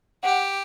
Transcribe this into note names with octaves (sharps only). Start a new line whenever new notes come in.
G4 F#5